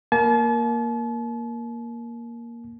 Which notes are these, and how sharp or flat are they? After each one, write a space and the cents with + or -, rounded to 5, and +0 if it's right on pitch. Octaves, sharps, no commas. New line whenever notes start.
A#3 +5 A5 -40